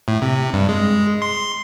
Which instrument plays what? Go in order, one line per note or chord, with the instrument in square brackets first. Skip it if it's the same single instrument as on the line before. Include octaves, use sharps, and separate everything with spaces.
[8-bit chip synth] A2
C3
G2
G#3
C6